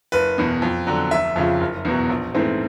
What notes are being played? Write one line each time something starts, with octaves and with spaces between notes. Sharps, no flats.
F#1 B4
E2 B2
F2
D3 F#3
F1 E5
F2 C#3 F3
F#1
E2 B2 F#3
A#1
G#2 E3 A3 C4